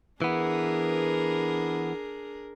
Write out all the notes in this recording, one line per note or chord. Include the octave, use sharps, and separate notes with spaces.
E3 B3 D4 G#4 A#4